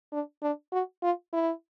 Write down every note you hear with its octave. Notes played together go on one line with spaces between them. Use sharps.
D4
D4
F#4
F4
E4